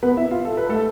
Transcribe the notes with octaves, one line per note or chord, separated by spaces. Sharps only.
B3 B4
E4 E5
F4 F5
A4
B4
A3 A4